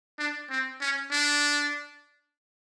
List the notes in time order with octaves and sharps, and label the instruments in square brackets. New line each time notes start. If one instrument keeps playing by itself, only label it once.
[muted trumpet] D4
C4
C#4
D4